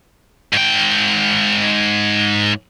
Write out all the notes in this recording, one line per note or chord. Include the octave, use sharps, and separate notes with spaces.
G#2 G5